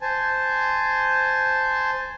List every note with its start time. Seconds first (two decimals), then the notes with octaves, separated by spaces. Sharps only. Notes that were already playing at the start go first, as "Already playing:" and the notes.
0.01 C5 G#5 A5